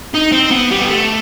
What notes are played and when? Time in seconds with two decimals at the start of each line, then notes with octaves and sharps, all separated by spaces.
0.14 D#4
0.32 C4
0.51 B3
0.71 G3
0.81 B3
0.89 A3